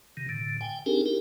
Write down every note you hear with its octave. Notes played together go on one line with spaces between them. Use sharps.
C3 D#3
A2 D3
G5 G#5
C4 D4 D#4 G4 G#4 A#4
E4 G4 A#4